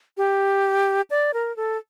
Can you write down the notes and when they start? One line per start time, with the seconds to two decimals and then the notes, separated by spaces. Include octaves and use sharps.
0.17 G4
1.10 D5
1.34 A#4
1.57 A4